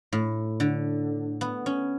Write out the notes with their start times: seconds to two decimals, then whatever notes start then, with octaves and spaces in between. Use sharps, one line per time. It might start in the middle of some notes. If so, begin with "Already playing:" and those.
0.13 A2
0.60 D3
1.41 B3
1.66 C#4